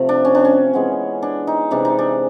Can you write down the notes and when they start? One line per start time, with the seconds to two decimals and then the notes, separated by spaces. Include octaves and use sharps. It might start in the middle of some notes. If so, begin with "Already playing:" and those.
Already playing: C3 F3 A3 C4
0.09 D4
0.25 C#4
0.35 D4
0.45 C#4
0.73 E3 G#3 B3
1.23 D4
1.47 D#4
1.71 C3 E3 G#3 D4
1.85 D#4
1.99 D4